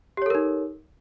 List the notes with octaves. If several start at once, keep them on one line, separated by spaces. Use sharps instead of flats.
D#4 G4 A4 A#4 C#5